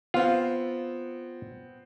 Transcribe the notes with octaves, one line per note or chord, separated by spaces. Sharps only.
B3 C4 F4